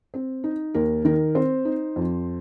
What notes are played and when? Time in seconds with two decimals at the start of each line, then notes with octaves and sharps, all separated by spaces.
0.14 C4
0.44 D#4
0.74 D#2 A#4
1.05 D#3 A#4
1.35 C4 C5
1.65 D#4
1.96 F2